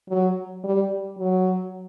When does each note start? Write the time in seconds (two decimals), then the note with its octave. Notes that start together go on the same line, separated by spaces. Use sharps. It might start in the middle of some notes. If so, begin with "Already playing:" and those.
0.10 F#3
0.64 G3
1.18 F#3